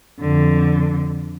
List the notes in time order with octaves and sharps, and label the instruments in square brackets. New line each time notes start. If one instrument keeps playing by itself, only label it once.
[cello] F2 D3